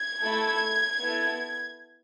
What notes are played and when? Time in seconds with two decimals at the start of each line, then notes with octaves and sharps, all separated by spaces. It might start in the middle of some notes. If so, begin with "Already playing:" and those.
Already playing: G#6
0.22 A3 E4 A4
1.00 B3 E4 A4